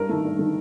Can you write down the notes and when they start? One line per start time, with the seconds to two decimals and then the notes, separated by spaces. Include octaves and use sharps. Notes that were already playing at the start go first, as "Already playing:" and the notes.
Already playing: G2 A#4
0.09 D#3 A3
0.24 G2
0.39 D#3 A3